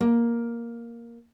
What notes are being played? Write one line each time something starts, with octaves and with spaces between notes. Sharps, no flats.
A#3